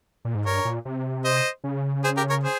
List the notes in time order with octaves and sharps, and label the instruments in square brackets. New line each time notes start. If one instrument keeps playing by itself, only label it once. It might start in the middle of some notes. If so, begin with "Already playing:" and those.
[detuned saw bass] A#2
G#2
[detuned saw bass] G2 [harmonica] A#4 C#5
[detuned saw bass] A#2
C3
[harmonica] C5 D#5
[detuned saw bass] C#3
[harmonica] G#4 C5
G4 A#4
A#4 C#5
G#4 C5